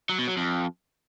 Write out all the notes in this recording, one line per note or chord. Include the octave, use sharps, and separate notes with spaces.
F#3
B2
F#3
F2